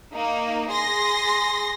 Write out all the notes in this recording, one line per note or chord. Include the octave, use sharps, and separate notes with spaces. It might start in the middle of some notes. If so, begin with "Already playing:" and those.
A#3 D#4
G#4 C6 A#6